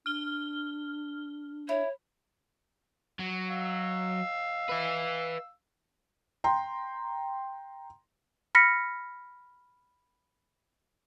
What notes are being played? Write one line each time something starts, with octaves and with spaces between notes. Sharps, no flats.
D4 F6 G7
E4 C#5
F#3
F5 E6
B4 E5
G5 A#5 C6
B5 F6 A#6 B6 C#7